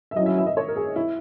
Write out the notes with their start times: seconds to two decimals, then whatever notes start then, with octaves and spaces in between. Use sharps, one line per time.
0.11 E5
0.16 F#3 C#4 E4 D#5
0.26 E5
0.38 E5
0.47 D#5
0.57 C#5
0.68 A#4
0.76 G#4
0.96 E4